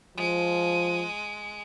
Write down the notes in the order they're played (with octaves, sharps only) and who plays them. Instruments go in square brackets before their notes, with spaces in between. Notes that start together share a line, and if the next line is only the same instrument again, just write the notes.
[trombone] F3 [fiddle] G#3